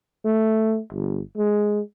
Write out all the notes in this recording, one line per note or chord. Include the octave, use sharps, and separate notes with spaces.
A3
G1
G#3